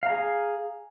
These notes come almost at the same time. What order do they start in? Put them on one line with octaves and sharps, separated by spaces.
F5 A#5 G#4